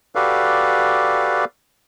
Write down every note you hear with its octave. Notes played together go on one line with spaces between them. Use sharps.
F#4 G4 A4 B4 D5 F5